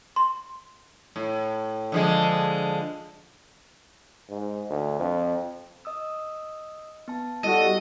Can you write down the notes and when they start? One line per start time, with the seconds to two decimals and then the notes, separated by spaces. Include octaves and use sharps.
0.16 C6
1.16 A2
1.92 D3 F3 G#3
4.29 G#2
4.69 D2
4.99 F2
5.85 D#5 D#6 E6
7.08 B3 A5
7.44 G3 E4 F#4 A4 D#5